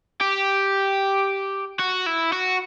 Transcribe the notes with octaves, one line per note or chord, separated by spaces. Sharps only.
G4
F#4
E4
F#4